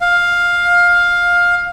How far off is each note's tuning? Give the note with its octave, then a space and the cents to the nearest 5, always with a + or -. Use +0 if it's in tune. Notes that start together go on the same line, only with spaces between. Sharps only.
F5 +10